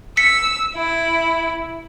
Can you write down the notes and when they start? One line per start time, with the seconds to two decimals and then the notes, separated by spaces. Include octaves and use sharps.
0.17 E6 B6 C#7
0.73 E4